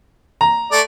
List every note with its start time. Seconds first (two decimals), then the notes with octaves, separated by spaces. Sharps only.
0.41 A#5
0.72 A3 D5